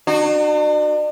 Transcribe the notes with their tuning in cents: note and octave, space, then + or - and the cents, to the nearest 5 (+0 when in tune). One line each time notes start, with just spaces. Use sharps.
D4 +45 F#4 +0